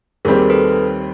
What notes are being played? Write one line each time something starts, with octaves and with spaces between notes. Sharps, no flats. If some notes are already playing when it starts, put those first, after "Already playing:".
D#2 D#3 G3 C4 G#4 A#4
A4 B4